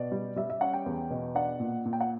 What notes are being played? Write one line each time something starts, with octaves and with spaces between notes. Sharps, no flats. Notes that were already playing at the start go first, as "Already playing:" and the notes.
Already playing: B2 D5
G3
G3 E5
E5
C#4 F#5
G5
E2
B2
D4 F#5
A#2
A#2
G5
F#5